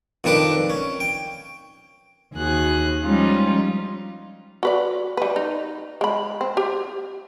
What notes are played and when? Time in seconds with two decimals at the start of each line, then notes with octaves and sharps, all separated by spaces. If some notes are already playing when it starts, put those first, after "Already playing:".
0.24 F2 D#3 D4 B4 D6
0.70 C#4
1.00 G5
2.35 D#2 F#4 G#4 F#6
3.03 F3 G3 G#3 C#4 D#4 F4
4.63 F#4 B4 D5
5.17 G3 B4
5.36 D#4
6.01 G#3 B5
6.41 C4
6.57 G4